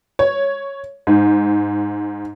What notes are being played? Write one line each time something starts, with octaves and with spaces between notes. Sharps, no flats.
C#5
G#2